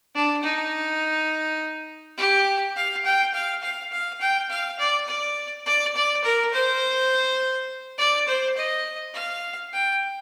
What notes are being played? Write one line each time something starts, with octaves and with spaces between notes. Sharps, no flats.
D4
D#4
G4
F5
G5
F5
F5
F5
G5
F5
D5
D5
D5
D5
A#4
C5
D5
C5
D#5
F5
G5